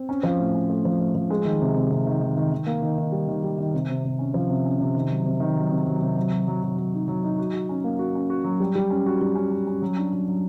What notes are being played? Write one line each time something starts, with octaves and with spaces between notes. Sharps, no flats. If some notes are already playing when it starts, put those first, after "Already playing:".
Already playing: C4
C#4
F3
A2
C#4
A3
F3
A3
F3
G#3
D#3
C3
C3
C3
D#3
D#3
D#3
D#3
A#3
D#3
D#3
G3
D#3
G3
D#3
C3
C3
C3
C#4
F3
C3
C#4
C3
D#3
F#3
C3
D#3
F#3
C3
F#3
C3
F#3
F#3
F#3
F#3
F#3
D#4
F#3
D#4
F#4
F#4
C#4
A#3
F#4
C#4
F#4
F#3
G3
G3
C#4
F#4
G3
C#4
C#4
C#4
F#3
D4
F#3
F#3